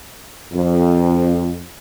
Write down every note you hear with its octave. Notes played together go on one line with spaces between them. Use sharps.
F2